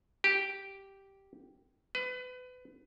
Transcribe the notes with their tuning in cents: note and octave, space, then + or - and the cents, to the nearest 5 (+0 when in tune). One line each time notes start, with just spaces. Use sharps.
G4 -5
B4 +30